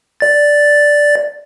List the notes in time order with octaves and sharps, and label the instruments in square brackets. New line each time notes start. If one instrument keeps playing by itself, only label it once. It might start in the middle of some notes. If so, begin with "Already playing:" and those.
[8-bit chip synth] D5 A6